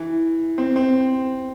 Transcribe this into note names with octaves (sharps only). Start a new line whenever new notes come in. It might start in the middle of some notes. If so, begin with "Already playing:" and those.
Already playing: E3
C4
C4